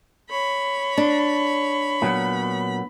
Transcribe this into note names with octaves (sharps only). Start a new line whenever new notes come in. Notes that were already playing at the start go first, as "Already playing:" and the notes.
C#5 B5
D4
A#2 F#3 B3